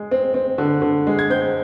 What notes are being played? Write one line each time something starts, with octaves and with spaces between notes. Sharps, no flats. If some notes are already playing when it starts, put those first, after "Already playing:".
Already playing: G#3
C4
C4
D3
D3
G#3
G#6
C4 G6